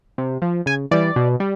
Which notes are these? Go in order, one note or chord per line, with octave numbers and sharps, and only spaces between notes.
C3
F3
C#3 G#5
E3 G3 D5
B2
G3